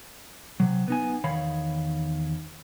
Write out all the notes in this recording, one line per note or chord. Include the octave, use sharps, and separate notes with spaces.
C3 F#3
B3 D#4 G#5
E2 D#3 C#5 F5 B5